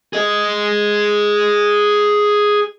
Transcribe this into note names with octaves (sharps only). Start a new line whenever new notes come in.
G#4 D#5